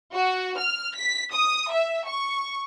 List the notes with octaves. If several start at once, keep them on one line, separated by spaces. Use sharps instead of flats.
F#4
F6
B6
D#6
E5
C#6